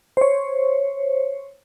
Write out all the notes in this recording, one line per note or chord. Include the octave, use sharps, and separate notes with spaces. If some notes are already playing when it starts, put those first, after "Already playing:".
C5 C#5